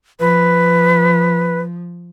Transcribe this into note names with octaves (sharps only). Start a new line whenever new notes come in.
F3 B4